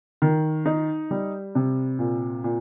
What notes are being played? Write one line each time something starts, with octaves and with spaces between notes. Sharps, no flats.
D#3
D#4
G3
C3
A#2
A#2